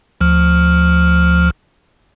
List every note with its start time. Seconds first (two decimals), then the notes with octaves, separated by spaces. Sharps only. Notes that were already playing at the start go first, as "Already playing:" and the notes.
0.21 D2 F3 F6